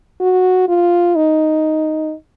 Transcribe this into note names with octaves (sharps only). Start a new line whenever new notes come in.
F#4
F4
D#4